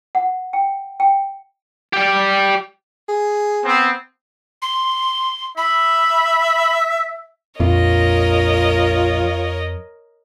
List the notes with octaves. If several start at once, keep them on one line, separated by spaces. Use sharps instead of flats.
F#5
G5
G5
G4 D5
G#4
B3 C4
C6
E5 B5
A#1 F2 F4 A#4 C#5 D#5